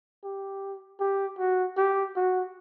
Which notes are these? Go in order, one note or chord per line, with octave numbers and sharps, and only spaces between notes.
G4
G4
F#4
G4
F#4